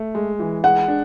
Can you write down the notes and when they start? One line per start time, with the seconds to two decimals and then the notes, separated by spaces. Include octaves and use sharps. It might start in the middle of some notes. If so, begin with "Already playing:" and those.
Already playing: A3
0.15 G#3
0.39 E3
0.64 G#3 F#5
0.88 D4